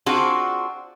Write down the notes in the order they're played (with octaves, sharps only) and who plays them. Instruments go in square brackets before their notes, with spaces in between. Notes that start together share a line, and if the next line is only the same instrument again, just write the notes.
[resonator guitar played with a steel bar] C4 D4 F4 F#4 G#4 D5